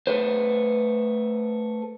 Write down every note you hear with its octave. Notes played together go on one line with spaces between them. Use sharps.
A3 B4 C5